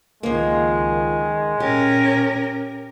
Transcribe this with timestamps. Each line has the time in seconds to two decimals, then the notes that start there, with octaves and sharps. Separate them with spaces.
0.23 C#2 D#3 F3 G#3 A#3
1.60 A#2 C#4 G4 A#4